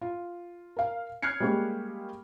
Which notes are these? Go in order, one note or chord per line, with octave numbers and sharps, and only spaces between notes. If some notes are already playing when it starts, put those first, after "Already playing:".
F4
A#4 F5
F6 F#6 G#6 C7 C#7
G3 G#3 A#3 C#4 G4